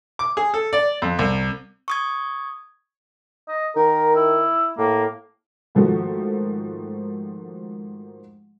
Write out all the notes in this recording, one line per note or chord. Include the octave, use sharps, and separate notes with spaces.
D6
G#4
A4
D5
F2
C2
C#6 D#6 G#6
D#5
D#3 A#4
E4
A2 A#3
G#2 D#3 F3 A3 F#4